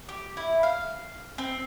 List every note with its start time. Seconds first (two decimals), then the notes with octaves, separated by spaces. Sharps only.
0.09 G4
0.37 E4
0.63 F5
1.38 C4